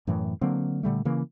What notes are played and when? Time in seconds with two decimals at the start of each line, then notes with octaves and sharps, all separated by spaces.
0.07 F#2 A2 E3
0.41 D3 F#3 A#3 C4
0.83 A#2 D3 G3 A3
1.05 C#3 E3 A#3